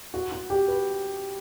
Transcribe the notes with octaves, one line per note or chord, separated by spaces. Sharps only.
F#4
F#4
G4
B4